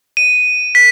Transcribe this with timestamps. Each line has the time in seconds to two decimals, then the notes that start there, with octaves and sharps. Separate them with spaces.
0.17 D#7
0.75 B6